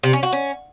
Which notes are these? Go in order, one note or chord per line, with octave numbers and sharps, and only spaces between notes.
C3
C#4
F#4
C#4